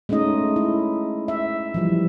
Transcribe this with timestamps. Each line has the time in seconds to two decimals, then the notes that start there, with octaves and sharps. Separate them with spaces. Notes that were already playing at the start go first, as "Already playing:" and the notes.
0.09 G#3 A3 C#4 D#4 D#5
0.56 E4
1.28 E5
1.74 E3 F3 G3